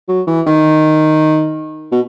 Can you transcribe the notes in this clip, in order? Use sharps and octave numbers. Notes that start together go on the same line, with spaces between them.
F#3
E3
D#3
B2